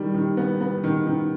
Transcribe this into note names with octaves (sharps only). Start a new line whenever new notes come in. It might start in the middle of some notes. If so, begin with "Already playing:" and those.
Already playing: D#3 G3
D#3
B3
B3
D#3
D#3